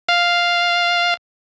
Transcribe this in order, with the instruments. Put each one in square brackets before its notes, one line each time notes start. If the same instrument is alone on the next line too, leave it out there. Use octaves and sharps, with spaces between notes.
[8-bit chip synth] F5